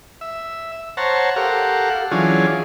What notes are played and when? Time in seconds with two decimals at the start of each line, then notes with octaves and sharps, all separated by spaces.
0.21 E5
0.97 C5 C#5 F#5 A5 A#5
1.36 G4 A4 A#4 F5 F#5
2.11 E3 F#3 C#4 D4 F4 G#4